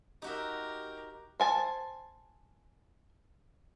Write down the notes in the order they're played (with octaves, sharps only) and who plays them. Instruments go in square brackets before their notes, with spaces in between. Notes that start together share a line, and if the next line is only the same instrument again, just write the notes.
[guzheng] D#4 F#4 E5 [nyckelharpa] G4 A#4
[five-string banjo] C5 G#5 A5